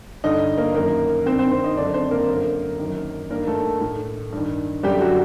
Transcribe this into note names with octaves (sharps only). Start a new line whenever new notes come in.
G2 D3 D#4 D#5
A#3 A#4
F#2 D#3 A#3 A#4
G2 D#3 C4 C5
C4 C5
C4 C5
D#4 D#5
F#2 D3 D4 D5
C4 C5
A#3 A#4
F#2 D3
F#2 D#3
G2 D#3 A#3 A#4
A3 A4
A2
G2 D#3
F#2 D3 G3 G4
F#3 F#4